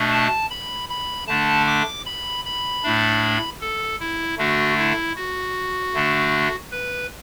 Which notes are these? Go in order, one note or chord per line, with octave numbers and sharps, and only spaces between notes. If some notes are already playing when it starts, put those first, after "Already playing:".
Already playing: B2 A3 D4
A5
B5
B5
D3 A3 D4 A5
D6
B5
B5
A2 A3 D4
A4
E4
D3 A3 D4 F#4
E4
F#4
D3 A3 D4
B4